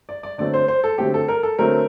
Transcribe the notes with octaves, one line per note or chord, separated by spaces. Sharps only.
D5
D5
D3 F#3 A3 C4 D5
C5
C5
A4
D3 F#3 A3 C4 G4
A4
A#4
A4
D3 F#3 A3 C4 A#4